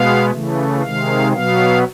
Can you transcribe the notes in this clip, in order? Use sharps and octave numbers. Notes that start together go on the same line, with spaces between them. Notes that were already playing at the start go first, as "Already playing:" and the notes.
Already playing: B2 G#3 B3 F5
C#3 E3 A3
C3 D#3 G#3 F5
B2 F#3 B3 F5